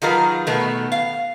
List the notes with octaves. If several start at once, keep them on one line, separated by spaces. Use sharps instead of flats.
D#3 F#3 F4 G#4 A#4 B4
B2 D#3 A3 B3
F5